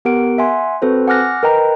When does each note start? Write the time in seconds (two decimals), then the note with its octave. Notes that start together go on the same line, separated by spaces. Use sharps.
0.05 B3 G4 A#4 F#5 D7
0.38 E5 F#5 G#5 C6
0.82 C4 F#4 A4 B4 C5
1.08 F#5 G#5 D6 F6 F#6 A#6
1.43 A#4 B4 D#5 G5 A#5